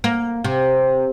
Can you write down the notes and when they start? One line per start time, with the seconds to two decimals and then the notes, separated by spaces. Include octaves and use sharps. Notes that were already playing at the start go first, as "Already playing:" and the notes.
0.04 A#3
0.44 C3